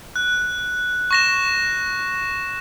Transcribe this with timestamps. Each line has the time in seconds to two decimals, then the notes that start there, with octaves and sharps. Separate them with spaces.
0.16 F#6
1.11 C#6 A#6 E7